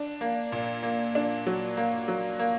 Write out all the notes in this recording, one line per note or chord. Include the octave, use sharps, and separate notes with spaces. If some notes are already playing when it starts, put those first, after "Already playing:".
Already playing: D4
A#3
A#2
A#3
D4
F#3
A#3
F#3
A#3